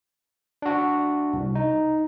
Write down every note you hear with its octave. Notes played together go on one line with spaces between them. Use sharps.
D4 F#4
C2
D#4